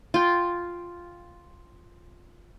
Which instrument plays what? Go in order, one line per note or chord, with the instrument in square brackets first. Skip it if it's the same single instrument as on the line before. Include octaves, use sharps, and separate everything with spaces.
[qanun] F4 G5